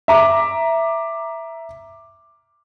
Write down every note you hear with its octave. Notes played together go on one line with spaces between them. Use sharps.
E5 A#5 D6